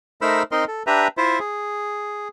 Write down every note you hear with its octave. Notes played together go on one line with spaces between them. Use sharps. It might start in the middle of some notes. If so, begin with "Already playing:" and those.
A3 D#4 A#4 C5 B5 E6
C4 D#4 A#4 D#5 C6
A4
D4 G4 B4 E5 A#5
E4 F4 C5 E5
G#4